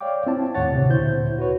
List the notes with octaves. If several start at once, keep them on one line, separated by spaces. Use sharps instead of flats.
C#5 D5 F5 G5 D6
C4 E4 A5
D#2 A2 C#5 F#5 A6
D2 C3
D2 A#2 E4 C5 G6
F#4 B4 C#5